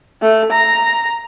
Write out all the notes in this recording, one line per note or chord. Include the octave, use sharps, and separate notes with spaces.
A3
A#5